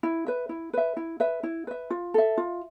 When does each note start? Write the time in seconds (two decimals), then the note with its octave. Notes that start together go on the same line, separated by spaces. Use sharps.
0.03 E4
0.26 B4 E5
0.49 E4
0.73 B4 E5
0.97 E4
1.20 B4 E5
1.43 E4
1.67 B4 E5
1.90 F4
2.14 A4 E5
2.38 F4